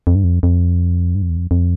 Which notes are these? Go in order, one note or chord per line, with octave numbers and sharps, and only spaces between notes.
F2
G2
F2
F2
G2
F2
E2
F2
F2